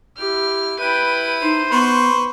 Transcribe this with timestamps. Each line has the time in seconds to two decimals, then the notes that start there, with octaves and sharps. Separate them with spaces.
0.18 E4 G4 F6
0.80 E4 B4 G5 D#7
1.42 D#4 C5
1.71 B3 B4 C6 C#6